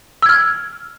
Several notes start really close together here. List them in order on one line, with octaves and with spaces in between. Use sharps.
E6 G#6 F6